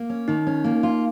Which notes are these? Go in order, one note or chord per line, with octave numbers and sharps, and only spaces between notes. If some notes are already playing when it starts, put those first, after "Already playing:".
Already playing: A#3
C#4
D#3 D#4
C#4
A#3
F4